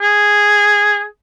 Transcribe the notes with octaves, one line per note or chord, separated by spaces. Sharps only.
G#4